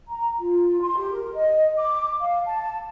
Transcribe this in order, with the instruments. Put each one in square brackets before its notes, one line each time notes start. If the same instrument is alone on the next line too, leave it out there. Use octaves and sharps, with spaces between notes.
[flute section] A#5
F4
C6
G4
A#4
D#5
D6
F5
A5